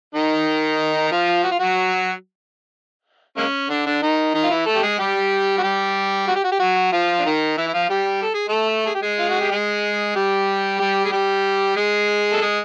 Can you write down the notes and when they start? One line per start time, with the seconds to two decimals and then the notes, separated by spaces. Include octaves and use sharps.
0.15 D#3 D#4
1.12 F3 F4
1.44 F#4
1.51 F4
1.59 F#3 F#4
3.37 G#3 A#3 C#4
3.70 D3 D4
3.86 D3 D4
4.02 D#3 D#4
4.34 D#3 D#4
4.43 F4
4.50 E3 E4
4.66 A3 A4
4.75 G4
4.82 G#3 G#4
4.99 G3 G4
5.58 F#4
5.63 G3 G4
6.28 F#4
6.36 G4
6.44 F#4
6.52 G4
6.60 F#3 F#4
6.92 F3 F4
7.19 D4
7.25 D#3 D#4
7.57 E3 E4
7.68 E4
7.74 F3 F4
7.89 G3 G4
8.22 A4
8.34 G#4
8.49 A3 A4
8.86 G#4
8.94 G4
9.03 G#3 G#4
9.19 F4
9.29 F#4
9.41 G4
9.51 G#3 G#4
10.16 G3 G4
10.80 G3 G4
11.05 G#4
11.12 G3 G4
11.76 G#3 G#4
12.32 A4
12.42 G#3 G#4